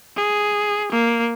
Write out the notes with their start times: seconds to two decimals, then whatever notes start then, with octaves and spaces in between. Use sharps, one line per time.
0.16 G#4
0.92 A#3